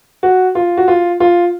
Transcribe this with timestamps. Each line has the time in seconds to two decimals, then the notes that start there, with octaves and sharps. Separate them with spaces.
0.23 F#4
0.55 F4
0.77 F#4
0.88 F4
1.20 F4